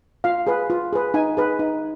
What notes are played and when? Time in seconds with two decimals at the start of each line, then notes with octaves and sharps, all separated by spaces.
0.24 F4 F5
0.47 G#4 B4
0.70 F4
0.93 G#4 B4
1.14 D#4 G#5
1.37 G#4 B4
1.59 D#4